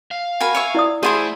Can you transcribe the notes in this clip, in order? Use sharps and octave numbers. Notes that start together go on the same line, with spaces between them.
F5
F#4 A#4 G#5 B5
C#5 E5 C#6
E4 D5 D#6
A3 E4 F4 G4 G#4 C5 F#5 C6